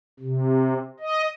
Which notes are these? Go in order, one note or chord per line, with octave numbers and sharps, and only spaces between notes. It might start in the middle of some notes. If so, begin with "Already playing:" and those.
C3
D#5